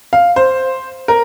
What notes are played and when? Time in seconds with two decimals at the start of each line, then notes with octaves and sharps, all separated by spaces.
0.13 F5
0.36 C5
1.08 A#4